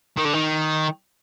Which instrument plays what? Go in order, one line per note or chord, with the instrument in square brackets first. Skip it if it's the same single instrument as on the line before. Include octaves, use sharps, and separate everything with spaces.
[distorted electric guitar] D#3
D3
D#3